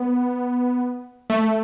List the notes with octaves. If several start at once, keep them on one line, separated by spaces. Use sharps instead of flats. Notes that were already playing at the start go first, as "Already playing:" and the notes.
Already playing: B3
A3